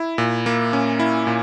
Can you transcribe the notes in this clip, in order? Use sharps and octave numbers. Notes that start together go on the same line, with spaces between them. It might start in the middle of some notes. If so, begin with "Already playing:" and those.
Already playing: E4
A#2
A#3
C#4
E4
A#2